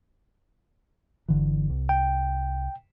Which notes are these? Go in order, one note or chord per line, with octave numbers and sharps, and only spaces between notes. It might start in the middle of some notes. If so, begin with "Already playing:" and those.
G1 D3 E3
C2
G5